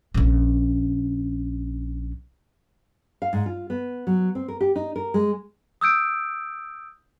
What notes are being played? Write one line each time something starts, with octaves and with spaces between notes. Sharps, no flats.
A#1 C#4
F5
G#2
F4
B3
F#3
C4
A#4
G4
D#4
A#4
G#3
D#6 E6 G6 D7